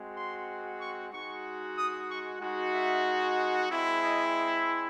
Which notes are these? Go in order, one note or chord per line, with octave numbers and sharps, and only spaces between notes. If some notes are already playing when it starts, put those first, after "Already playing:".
Already playing: G#3 C4 F#4
C6
C#6
G#3 D#4 F#4 C#6
D#6
C#6
G#3 D#4 F#4
E5
G#3 C4 E4
D#5